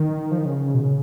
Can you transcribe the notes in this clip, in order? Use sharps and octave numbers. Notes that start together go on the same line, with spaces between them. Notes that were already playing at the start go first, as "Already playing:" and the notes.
Already playing: D#3
F3
D#3
C#3
B2
C#3